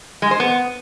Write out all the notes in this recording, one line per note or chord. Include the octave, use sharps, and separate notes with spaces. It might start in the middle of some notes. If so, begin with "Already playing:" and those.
G#3
C5
B3